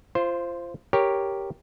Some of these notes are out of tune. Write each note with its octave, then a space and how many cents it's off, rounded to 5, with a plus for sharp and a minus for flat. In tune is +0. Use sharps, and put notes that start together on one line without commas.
F4 -25 C5 +0
G4 +0 A#4 +0 C#5 +0